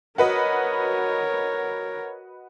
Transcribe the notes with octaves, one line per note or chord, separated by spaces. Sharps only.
F#4 A#4 B4 C#5 D#5